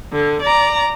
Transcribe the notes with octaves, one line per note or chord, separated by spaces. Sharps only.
D3
D5 A#5